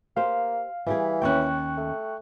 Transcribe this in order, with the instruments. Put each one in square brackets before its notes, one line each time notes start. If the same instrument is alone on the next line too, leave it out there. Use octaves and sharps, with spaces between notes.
[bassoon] A#3 [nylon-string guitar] G4 C5 [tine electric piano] F5
[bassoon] E3 [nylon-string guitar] G3 G4 G#4
[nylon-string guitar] D#2 C#4 [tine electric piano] G5 C#6 F#6
[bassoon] A3